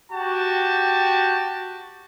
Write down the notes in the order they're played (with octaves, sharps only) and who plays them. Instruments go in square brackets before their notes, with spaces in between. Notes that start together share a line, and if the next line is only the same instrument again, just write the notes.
[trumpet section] F#4 G4 G5 A5